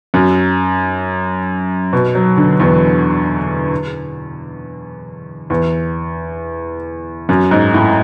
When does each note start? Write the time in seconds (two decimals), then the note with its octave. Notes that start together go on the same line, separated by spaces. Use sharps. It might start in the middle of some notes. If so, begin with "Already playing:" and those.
0.14 F#2
1.93 B2
2.15 F#3
2.37 D3
2.60 E2
5.50 E2
7.29 F#2
7.51 G#2
7.74 A2